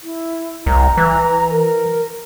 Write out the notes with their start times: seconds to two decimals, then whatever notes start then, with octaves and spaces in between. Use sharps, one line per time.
0.03 E4
0.66 C2 A#5
0.97 E3
1.50 A#4